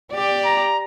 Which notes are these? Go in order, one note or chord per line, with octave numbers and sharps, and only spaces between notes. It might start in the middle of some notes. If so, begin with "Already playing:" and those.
G4 D5
A#5